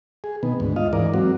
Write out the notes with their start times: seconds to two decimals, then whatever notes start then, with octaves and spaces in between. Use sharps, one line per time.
0.24 G#4
0.43 B2 D#3 B3
0.60 D2 G#2
0.76 F4 D#5 F5
0.93 G#2 E3 A#4 D5
1.14 F#3 C4 F#4